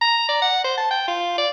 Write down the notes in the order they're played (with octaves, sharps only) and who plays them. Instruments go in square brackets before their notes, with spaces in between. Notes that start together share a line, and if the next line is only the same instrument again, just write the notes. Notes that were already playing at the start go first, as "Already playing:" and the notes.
[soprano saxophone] A#5
D5
F#5
C5
A5
G5
F4
D5